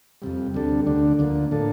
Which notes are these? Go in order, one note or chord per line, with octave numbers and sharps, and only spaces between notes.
F2 C3 G3
D2 C3 G3 D4 A4
D2 D3 A3 D4
D2 D3 F3 A#3
A2 F3 A#3 D4 A4